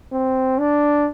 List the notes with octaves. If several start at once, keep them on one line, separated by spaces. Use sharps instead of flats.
C4
D4